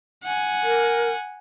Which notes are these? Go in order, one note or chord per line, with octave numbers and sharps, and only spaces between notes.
F#5 G#5
A#4